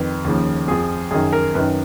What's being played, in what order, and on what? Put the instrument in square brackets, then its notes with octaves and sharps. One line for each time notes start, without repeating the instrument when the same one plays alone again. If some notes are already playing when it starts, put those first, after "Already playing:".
Already playing: [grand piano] F2 D#3 B4
D#2 C#3 F3
F2 F3 G#4
F#2 D#3 G#4
A#4
F#2 D#3 B4